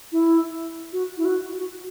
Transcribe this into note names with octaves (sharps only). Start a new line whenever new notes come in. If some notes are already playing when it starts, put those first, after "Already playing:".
E4
F#4
E4
F#4
F#4